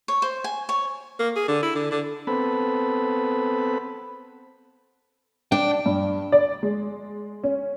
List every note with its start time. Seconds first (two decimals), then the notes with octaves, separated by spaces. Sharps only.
0.08 C#5
0.22 C5
0.44 G#5
0.69 C#5
1.19 A#3
1.36 G#4
1.48 D3
1.63 E4
1.75 D3
1.91 D3
2.27 B3 C4 A4 B5
5.52 D4 G5
5.86 G2
6.32 D5
6.63 G#3
7.44 C#4